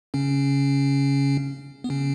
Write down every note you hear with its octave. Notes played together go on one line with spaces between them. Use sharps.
C#3 C#4
B3
C#3 C#4